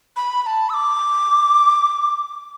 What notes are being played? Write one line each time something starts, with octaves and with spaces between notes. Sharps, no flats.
B5
B5
A5
E6
D6